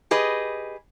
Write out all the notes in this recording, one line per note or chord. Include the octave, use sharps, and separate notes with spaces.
G4 G#4 B4 D#5